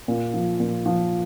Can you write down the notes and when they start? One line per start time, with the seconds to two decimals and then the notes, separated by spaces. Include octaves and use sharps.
0.08 A#2
0.34 F3
0.60 A#2
0.86 F3